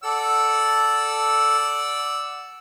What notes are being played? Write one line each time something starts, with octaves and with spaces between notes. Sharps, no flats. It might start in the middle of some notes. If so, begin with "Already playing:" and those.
A4 D5 F#5 E6